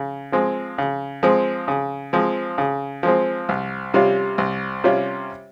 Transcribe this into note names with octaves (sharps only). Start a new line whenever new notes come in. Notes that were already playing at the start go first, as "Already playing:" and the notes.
Already playing: C#3
F3 G#3 C4
C#3
F3 G#3 C4
C#3
F3 G#3 C4
C#3
F3 G#3 C4
C2
C3 G3 C#4 F4
C2
C3 G3 C#4 F4